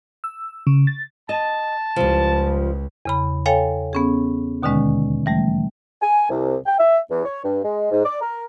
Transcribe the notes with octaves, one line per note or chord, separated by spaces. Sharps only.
E6
C#3
A6
D#5 A5
C#2 F3 G3
E2 C#3 B5
A4 C#5 F5 G5 G#5
B3 C#4 G#4
D#2 B2 D3 D#3 G#3 C#4
E3 G3 A3
G#5
C2
G5
E5
E2
C#5
G2
G#3
G#2
D5
A#4